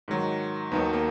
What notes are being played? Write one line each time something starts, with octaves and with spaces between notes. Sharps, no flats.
G#2 D#3 F#3
D#2 D#3 F#3 B3
A#3